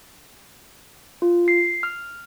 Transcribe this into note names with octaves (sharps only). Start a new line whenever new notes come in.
F4
C7
F6